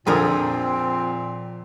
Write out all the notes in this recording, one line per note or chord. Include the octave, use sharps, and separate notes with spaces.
F2 A#2 D3 F3 C4 G#4 A#4 D#6